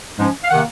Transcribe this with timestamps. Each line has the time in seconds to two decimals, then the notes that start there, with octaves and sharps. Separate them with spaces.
0.16 G#2 F3 G#3 C#4
0.43 F5
0.49 C3 D#3 A#3 F#5